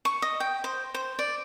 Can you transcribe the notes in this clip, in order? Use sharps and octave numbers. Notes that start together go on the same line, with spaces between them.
C#6
D#5
G5
C5
C5
D5